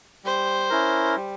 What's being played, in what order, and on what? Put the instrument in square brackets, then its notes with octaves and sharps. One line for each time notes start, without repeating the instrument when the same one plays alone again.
[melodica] G3 [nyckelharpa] C5
[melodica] C#4 E4 A#4
G3